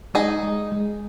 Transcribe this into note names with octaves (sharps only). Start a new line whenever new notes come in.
G#3 D#4 G#4
G#3
G#3